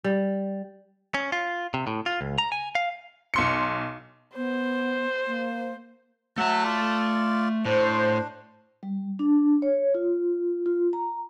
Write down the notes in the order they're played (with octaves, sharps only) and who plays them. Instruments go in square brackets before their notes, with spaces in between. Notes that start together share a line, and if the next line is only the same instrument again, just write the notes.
[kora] G3
[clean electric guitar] C#4
F4
C3
A2
F4
C#2
A#5
G#5
F5
[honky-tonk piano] B1 C6 C#7
[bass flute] B3 [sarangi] C5
[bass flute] A#3
[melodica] F#3 F#4 E5 [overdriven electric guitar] A3 A5
[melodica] F4 D5
[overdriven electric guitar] A2 [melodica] D4 [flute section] C5
[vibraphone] G3
D4
C#5
F4
F4
A#5